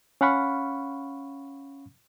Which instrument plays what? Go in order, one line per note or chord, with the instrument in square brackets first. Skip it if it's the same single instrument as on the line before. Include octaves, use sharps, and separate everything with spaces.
[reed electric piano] C#4 F5 F#5 B5 C#6